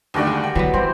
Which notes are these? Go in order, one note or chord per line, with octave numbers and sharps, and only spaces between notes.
D#2 D3 G3 A3 F#4 D5
G#3
G5
D3 E3 F#3 B3
E3 G3 C4 C5